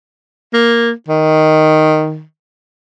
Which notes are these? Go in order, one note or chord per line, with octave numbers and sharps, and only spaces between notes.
A#3
D#3